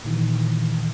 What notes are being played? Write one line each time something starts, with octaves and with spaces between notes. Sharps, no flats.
A#2 D#3 E3